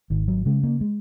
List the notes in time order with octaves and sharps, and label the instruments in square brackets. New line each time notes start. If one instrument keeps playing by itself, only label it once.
[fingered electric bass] G#1 D#3
F#3
C#3 G#3
A#3
G#3